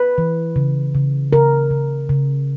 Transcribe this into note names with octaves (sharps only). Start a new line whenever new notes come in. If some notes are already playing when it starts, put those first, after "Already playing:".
Already playing: B4
E3
C#3
C#3
C#3 A#4
C#3
C#3